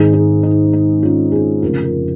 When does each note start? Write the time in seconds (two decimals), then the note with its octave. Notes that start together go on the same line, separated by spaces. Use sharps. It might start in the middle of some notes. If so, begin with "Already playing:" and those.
Already playing: G#1 G#2 D#3 D#4 G#4
0.13 D#4 G#4
0.43 D#4
0.73 D#4
1.03 C#4 F4
1.32 D#4 G#4
1.62 F1 F2 C#3 F4 A#4
1.84 F4 A#4